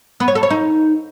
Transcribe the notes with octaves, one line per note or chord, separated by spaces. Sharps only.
B3
C#5
A4
C#5
D#4